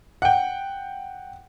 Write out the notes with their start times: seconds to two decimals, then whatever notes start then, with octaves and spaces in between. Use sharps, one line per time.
0.22 F#5 G5